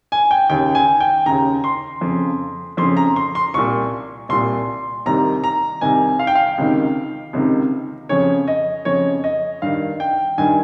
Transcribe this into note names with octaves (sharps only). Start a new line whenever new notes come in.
G#5
G5
D#2 C#3 G5
G#5
G5
D#2 C#3 A#5
C6
F2 C#3
F2 C#3 C6
A#5
C6
C6
C2 A#2 C#6
C2 A#2 C6
C2 C3 D#3 A#5
A#5
C2 C3 D#3 G#5
F5
G5
F5
C#2 C3 D#3
C#2 C3 D#3
F2 C#3 C#5
D#5
F2 C#3 C#5
D#5
G2 D#3 F5
G5
G2 D#3 G#5